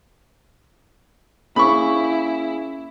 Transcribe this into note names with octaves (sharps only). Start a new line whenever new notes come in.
A#3 C#4 E4 G#4 B5 C#6